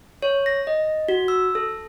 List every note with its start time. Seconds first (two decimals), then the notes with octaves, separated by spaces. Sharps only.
0.22 C#5
0.46 A#6
0.67 D#5
1.08 F#4
1.28 E6
1.55 A4